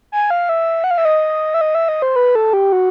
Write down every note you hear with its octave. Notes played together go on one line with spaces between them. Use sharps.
G#5
F5
E5
F#5
F5
E5
D#5
E5
D#5
E5
D#5
C5
B4
A4
G4
F#4